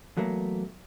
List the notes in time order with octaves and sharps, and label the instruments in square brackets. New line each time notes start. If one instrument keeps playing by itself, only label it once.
[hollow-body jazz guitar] E2 F#3 A3 A#3